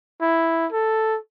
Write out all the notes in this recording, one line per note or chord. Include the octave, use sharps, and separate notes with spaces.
E4
A4